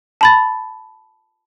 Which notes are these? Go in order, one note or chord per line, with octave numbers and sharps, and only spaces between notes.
A5 B5 A6